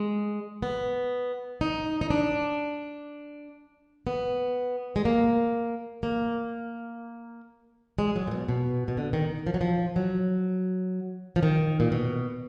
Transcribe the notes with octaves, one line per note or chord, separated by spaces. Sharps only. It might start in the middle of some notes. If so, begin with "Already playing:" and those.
Already playing: G#3
B3
D#4
D#4
D4
B3
G#3
A#3
A#3
G#3
F#3
A#2
B2
B2
B2
D3
D#3
F3
F#3
F3
F#3
F3
D#3
A#2
B2